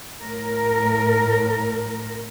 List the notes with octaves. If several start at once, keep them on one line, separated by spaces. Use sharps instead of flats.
A2 A#4